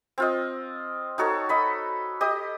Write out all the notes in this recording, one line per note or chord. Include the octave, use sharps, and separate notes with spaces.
C4 F4 D#5
D#4 F#4 A4 C#5
D#5 B5
G4 D#5 D#6